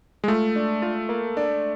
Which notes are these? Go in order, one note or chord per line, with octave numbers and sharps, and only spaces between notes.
G#3
A3 F4
D4
F4
A#3
D4